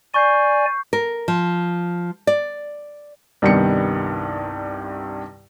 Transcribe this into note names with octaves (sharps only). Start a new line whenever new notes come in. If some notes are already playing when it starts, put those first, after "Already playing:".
D5 G#5 C#6 G6 C7
A#4
F3
D5
C2 G2 D#3 G3 B3 C#7